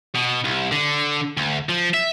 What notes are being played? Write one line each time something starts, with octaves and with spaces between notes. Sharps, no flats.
B2
C2
D3
D2
F3
E5